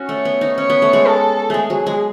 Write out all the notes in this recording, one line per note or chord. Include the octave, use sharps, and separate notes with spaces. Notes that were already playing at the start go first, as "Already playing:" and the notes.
Already playing: C#4 F#4
A3 C#5
B3
D#4
C#4 C#5
B3
A3
G#3
A4
G#3 A3 G#4
F#3
G#3